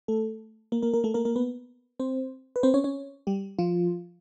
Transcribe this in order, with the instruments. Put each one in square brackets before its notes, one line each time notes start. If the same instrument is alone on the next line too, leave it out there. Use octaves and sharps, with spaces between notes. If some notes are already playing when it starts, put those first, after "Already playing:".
[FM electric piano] A3 A4
A#3 A#4
A#3 A#4
A#3 A#4
A3 A4
A#3 A#4
A#3 A#4
B3 B4
C4 C5
B4
C4 C5
C#4 C#5
C#4 C#5
G3 G4
F3 F4